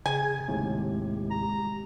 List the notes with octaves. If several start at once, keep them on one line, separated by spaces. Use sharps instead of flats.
C#3 G#4 G#5 G#6
D#2 A2 C3 G#3 G4
A#5